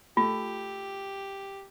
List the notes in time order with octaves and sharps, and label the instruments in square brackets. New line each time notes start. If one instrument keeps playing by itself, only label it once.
[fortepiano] A3 [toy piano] F4 [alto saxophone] G4